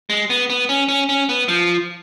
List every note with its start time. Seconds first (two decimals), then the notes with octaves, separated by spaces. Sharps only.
0.10 G#3
0.30 B3
0.50 B3
0.69 C#4
0.89 C#4
1.09 C#4
1.29 B3
1.48 F3